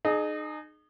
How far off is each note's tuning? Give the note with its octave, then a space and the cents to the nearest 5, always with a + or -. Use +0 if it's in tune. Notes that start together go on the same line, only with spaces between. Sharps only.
D#4 -30 G#4 +25